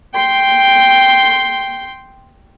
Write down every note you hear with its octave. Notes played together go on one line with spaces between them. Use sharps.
G5 C6